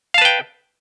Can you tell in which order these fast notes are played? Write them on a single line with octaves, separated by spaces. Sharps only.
F5 A5 B4 G5